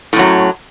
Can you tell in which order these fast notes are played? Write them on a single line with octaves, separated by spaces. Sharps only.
A2 F#2 F#3